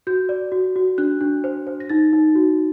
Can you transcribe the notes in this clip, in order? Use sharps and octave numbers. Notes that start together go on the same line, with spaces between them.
F#4 G6
D5
F#4
F#4
D4 F#6
D4
C5
C5
A#6
D#4 A6
D#4
F#4